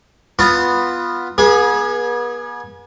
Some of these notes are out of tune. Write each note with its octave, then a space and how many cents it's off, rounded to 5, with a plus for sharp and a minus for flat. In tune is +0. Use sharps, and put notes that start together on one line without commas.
B3 +0 F4 +0 A5 +40
B3 -40 G#4 +0